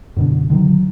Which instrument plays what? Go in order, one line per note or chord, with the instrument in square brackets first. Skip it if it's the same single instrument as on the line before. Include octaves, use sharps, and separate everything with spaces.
[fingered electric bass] F#2 B2 D3
D3 D#3 F3 F#3